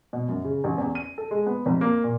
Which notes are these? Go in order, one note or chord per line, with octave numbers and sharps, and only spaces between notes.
B2
F#2
C#3
A1
E2
D#7
A4
G#3
B3
F1
A#3
A#2